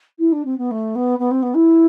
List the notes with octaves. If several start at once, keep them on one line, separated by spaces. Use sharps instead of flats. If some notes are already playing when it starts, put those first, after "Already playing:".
E4
D4
C4
B3
A3
B3
B3
C4
B3
E4